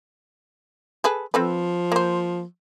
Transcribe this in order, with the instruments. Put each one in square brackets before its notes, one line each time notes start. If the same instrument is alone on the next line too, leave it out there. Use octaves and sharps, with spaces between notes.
[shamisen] G#4 A4 B4
[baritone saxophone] F3 [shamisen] C4 A4 B4
[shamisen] A#3 C5